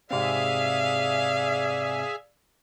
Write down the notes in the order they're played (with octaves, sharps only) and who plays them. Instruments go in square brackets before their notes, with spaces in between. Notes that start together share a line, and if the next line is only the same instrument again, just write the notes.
[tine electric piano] G#2 C3 C4 [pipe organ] G#4 E5 G#5 [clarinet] D5 [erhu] F5